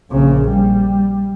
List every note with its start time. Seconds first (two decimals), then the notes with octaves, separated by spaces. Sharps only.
0.11 A#1 C#3
0.48 G3